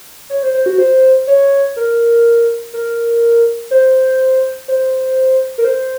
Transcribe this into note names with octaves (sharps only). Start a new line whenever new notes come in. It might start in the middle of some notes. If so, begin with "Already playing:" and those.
C#5
C5
C5
F#4
C5
C#5
A#4
A#4
C5
C5
A#4
C5